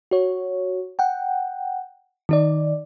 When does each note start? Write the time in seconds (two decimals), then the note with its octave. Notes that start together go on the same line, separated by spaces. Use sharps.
0.11 F#4 C#5
0.99 F#5 G5
2.29 D#3 D#4 D5